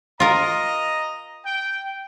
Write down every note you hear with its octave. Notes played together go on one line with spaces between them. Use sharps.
F4 A#4 D#5 A#5
G5